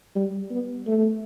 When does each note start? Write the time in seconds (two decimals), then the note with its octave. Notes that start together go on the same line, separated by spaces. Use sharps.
0.16 G3
0.51 B3
0.87 A3